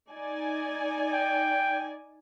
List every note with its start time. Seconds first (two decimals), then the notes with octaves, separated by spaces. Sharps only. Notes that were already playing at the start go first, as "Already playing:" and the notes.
0.11 D#4 D5 G#5
1.12 G5